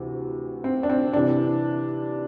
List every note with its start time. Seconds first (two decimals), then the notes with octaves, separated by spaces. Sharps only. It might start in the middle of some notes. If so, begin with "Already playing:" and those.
Already playing: D2 C3 E3
0.64 C4
0.83 D4
0.90 C4
1.13 C3 E3 D4